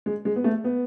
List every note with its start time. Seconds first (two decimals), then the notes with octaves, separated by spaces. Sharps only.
0.06 G#3
0.25 G#3
0.36 B3
0.44 A3
0.64 B3